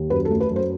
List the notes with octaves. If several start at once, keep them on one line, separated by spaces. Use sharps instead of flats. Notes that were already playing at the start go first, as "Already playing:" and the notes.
Already playing: D#2
F#2 B4
A4
A3
B4
F#2 C5